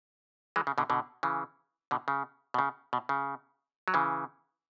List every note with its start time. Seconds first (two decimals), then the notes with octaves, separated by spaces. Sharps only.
0.56 E3 G#3
0.67 C#3
0.78 B2 D3
0.90 B2 D3
1.23 C#3 E3
1.91 B2 D3
2.08 C#3
2.54 B2
2.59 C#3
2.93 B2
3.09 C#3
3.88 F#3
3.94 C#3 E3